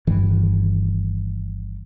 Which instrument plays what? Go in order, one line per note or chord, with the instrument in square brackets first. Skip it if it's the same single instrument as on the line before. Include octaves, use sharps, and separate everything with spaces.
[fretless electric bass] G1 G2 D#3 E3